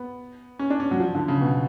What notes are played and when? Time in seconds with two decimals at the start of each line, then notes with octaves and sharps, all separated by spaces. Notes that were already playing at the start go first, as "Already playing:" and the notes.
Already playing: B3
0.59 C#4
0.70 D4
0.80 C#4
0.91 F#3
1.00 F3
1.15 D3
1.28 C#3
1.41 B2